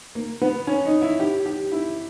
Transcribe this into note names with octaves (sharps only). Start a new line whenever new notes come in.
A#3
B3
C#4
D#4
E4
G4
G4
E4